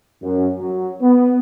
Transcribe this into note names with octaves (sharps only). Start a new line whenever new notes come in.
F#2
F#3
B3